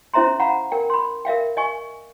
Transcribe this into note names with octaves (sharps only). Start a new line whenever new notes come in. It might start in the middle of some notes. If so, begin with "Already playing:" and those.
C#4 E4 C5 E5 A#5 C6
F5 F#5 A#5 B5
A#4 G5
B5 C6
A#4 E5 F5 G5
D#5 G#5 C#6